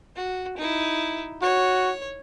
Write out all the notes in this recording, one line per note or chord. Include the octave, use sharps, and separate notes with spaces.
F#4
D#4 E4
F#4 C#5